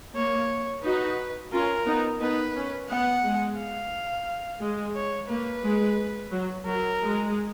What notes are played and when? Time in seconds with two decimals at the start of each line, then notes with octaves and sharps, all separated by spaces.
0.15 A#3 C#5
0.83 D#4 F#4 B4
1.52 C#4 F4 A#4
1.86 B3 D#4
2.21 B3 D#4 B4
2.55 C#4
2.89 B3 F#5
3.24 G#3
3.58 F5
4.60 G#3
4.95 C#5
5.29 A#3 B4
5.63 G#3
6.32 F#3
6.66 F#3 A#4
7.01 G#3